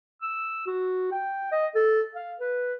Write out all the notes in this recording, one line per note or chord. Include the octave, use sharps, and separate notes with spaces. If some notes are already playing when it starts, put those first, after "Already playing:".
E6
F#4
G5
D#5
A4
F5
B4